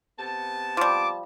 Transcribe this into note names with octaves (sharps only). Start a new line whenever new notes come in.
C3 B3 A5
F3 G3 D6